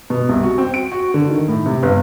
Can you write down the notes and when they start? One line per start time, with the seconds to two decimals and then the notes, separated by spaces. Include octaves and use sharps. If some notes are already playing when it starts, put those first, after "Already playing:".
0.10 B2
0.29 C2
0.43 F#4
0.58 C4
0.74 D7
0.92 F#4
1.14 D3
1.29 D#3
1.48 A2
1.66 C3
1.83 G1